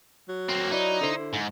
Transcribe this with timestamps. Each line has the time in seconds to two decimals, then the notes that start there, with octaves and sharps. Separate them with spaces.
0.29 F#3
0.49 A#3 C4
0.71 D#4 E4 B4 D5
1.01 D3 E4 C5
1.17 D3
1.33 G#2